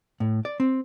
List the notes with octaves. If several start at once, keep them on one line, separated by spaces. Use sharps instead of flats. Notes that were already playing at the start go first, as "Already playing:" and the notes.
A2
D5
C4